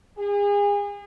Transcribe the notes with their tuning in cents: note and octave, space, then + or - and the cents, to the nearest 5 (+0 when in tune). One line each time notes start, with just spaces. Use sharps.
G#4 -35